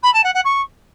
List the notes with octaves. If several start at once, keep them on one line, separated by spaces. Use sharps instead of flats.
B5
A5
F#5
F#5
C#6